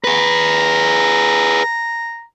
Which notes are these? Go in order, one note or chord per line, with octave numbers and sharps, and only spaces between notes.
G#4 B4 A#5